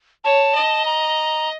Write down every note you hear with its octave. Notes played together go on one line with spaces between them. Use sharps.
C#5 A5
D#5
A#5